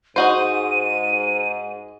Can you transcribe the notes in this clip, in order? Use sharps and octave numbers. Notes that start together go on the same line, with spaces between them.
G#2 D#4 F#4 C5 D#7